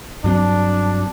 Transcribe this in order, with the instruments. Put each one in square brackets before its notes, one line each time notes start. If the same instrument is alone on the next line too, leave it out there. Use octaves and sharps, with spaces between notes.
[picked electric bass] G2 F#3 C4 [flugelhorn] D4